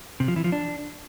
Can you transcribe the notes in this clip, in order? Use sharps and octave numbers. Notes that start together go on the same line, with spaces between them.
C3
F3
E3
F3
D4